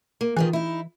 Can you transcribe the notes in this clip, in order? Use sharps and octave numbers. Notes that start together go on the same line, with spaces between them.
A#3
D#3 E3 F4 G#4
D#4 E4